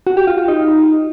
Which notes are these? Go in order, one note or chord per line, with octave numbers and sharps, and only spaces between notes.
F#4
G4
F4
F4
D#4